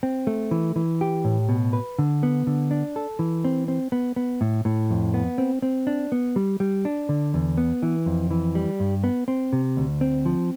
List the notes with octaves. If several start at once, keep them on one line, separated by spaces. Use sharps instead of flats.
C4
A3
E3
E3
G4
A2
B2
B4
D3
B3
D3
D4
A4
E3
C4
C4
B3
B3
A2
A2
F2
B3
C4
C4
D4
B3
G3
G3
D4
D3
E2
B3
E3
F2
E3
G3
G2
B3
C4
C3
D2
C4
F3